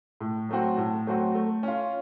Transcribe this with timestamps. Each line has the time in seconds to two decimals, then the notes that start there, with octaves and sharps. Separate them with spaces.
0.21 A2
0.49 F#3 A3 C4 F#4
0.77 A2
1.07 F#3 A3 C4 F#4
1.35 A3
1.63 C#4 F4